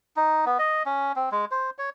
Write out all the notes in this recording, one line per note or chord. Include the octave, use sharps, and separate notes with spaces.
D#4
B3
D#5
C#4
C4
G#3
C5
C#5